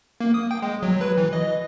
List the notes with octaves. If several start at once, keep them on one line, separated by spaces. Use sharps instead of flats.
A#3
D#6
G5
G#3
F#3
B4
E3
D#5